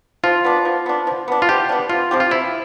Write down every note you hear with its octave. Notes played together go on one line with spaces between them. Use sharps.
F3 F4
B3 D4
F3
B3 D4
F3
B3 D4
F4
F3 G4
B3 D4
C3 F4
F3 C4 G4
F4
C3 E4